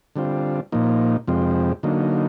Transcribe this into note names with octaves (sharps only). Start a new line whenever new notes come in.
D3 G3 C4 F4
A#2 F3 A#3 D#4
F2 C3 F3 G#3 C4
D3 F#3 A#3 D#4